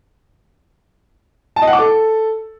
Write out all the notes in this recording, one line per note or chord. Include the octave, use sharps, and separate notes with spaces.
A5
D#5
F#5
D6
A4